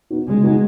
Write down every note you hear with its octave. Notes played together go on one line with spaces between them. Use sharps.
B3 D#4 F#4
C#3 G#3
B3 D#4 F#4